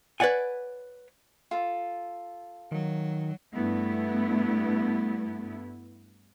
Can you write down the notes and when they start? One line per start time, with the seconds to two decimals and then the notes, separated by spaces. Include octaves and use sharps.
0.20 B4 C#5 D5 F#5 G#5
1.51 F4 A4
2.72 D#3 F#3
3.54 G2 A3 B3 E4